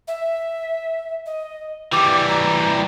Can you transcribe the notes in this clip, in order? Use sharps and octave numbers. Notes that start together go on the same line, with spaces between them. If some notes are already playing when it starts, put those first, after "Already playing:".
E5
D#5
E3 G3 D6
A#5